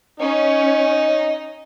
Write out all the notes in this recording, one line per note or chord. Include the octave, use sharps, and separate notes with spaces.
C#4 D#4